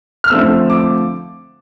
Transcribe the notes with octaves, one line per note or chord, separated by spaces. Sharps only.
F6
D3 F3 A3 C4 E6
D6